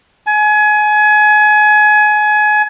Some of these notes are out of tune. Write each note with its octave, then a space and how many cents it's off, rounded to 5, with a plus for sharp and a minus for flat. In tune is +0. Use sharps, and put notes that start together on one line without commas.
G#5 +30